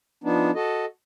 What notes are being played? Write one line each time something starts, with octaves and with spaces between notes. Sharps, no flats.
F3 B3 D4 D#4
F#4 A4 D#5